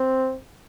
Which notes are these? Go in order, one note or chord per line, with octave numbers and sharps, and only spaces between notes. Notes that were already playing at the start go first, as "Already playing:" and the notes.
Already playing: C4